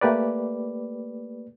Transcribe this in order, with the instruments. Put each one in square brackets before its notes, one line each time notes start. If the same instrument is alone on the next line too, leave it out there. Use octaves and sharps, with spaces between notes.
[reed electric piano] A3 A#3 G4 B4 D5